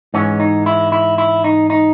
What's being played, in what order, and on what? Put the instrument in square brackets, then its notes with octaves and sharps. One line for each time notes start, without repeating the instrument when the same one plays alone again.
[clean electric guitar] G#2 E3 G#3 C#4
D#4
E4
E4
E4
D#4
D#4